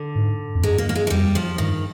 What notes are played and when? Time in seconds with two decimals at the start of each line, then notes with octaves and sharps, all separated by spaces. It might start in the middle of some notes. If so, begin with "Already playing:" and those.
Already playing: D3
0.15 G#2
0.55 F2
0.63 G2 G#3
0.78 A#3
0.89 A#3
0.96 G#3
1.07 G#3
1.10 F2 G3
1.35 F3
1.58 G2 D#3